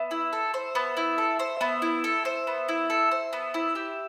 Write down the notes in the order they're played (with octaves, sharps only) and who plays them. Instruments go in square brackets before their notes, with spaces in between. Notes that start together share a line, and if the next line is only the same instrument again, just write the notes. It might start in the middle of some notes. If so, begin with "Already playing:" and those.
Already playing: [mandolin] B3 [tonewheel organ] E5
[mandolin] E4
A4
C5
B3
E4
A4
C5
[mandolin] B3 [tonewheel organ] E5
[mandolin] E4
A4
C5
B3
E4
A4
C5
B3
E4
G4